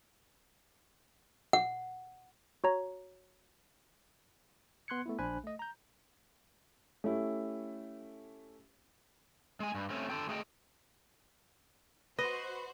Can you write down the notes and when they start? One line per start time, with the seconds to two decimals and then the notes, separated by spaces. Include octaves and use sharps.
1.53 F#5
2.64 F#4 C#5 A#5
4.88 B3 C6 F#6 G#6 C#7
5.06 A3 B3 E4
5.19 A#1 D4 C5 G#5 B5 F#6
5.44 A3 D#5
5.59 A#5 G6
7.04 A3 C#4 E4 G4
9.60 G#3 G#5
9.75 G2
9.90 A3 C4 C#4
10.10 D3 F4 A4 G5
10.29 A3 G#4 A4 D#5 G5
12.19 F#4 B4 C5 D#5